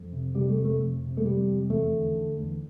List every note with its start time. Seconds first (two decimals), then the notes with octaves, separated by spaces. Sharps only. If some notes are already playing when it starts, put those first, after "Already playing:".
Already playing: F2
0.12 C3
0.35 C3 G3
0.50 A3
0.58 F2
0.65 A3
0.80 F2
1.03 C3
1.17 A3
1.25 C3 G3
1.48 F2
1.70 E2 A3
1.92 D3
2.15 D3
2.38 E2